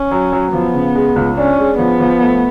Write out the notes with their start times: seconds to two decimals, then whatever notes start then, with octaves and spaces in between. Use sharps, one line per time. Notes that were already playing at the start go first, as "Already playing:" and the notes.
Already playing: C#4
0.11 F#3
0.32 F#3
0.53 F3 B3
0.74 C#3
0.95 G#3
1.16 C#2
1.37 C#4 D4
1.58 G#3
1.78 F3 B3
2.00 F3
2.21 A3